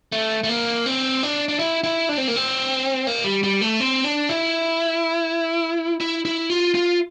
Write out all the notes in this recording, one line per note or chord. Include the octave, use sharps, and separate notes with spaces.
A3
A3
A#3
C4
D4
D4
E4
E4
D4
C4
A#3
C4
A#3
G3
G3
A3
C4
D4
E4
E4
E4
F4
F4